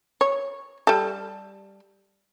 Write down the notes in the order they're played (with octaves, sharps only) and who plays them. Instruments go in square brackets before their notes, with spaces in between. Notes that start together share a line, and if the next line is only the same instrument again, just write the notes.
[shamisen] C#5
G3 A4